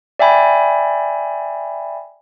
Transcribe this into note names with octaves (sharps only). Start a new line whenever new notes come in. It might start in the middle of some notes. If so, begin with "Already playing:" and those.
D5 E5 G5 G#5 B5